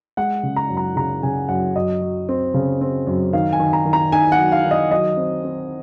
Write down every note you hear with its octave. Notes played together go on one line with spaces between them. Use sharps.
G#3 F#5
C#3
A#5
F#2
A#5
C#3 A#5
C#3 G#5
F#2 F#5
F#2 D#5
F#3
C4
C#3
C4
F#2
D#3 F5
G#5
D#3
A#5
D#3
A#5
D#4 G#5
F#5
F#3
F5
D#3
D#5
F#3 D#5
C4
C4